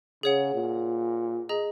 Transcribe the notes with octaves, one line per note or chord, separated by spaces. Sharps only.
C#3 G#4 C#5 F#5
A#2
G#4 D#5 A#5